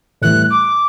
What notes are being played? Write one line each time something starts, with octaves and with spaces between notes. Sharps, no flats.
A2 E3 G3 F#6
D6